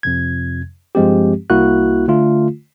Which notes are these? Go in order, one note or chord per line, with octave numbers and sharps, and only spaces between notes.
F2 C3 G#6
G2 F3 G#3 C4 G4
C2 A#3 E4 F#4 F#6
D3 A3 F4